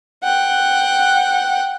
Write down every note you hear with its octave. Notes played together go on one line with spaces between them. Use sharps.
F#5 G5